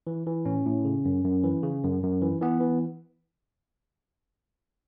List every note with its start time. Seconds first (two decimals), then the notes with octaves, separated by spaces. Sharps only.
0.07 E3
0.26 E3
0.45 A2 C#4
0.66 A2
0.85 C#3
1.05 F#2
1.24 F#2
1.44 E3
1.63 C#3
1.84 F#2
2.03 F#2
2.22 E3
2.41 E3 B3
2.61 E3